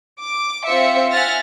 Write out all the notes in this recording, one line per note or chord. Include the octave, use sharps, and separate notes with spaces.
D6
C4 F4 C5 E5 C#7
E5 F#5 G#5 F6 A6 A#6